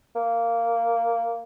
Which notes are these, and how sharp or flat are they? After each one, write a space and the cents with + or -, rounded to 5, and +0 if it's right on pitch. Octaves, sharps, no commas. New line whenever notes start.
A#3 -10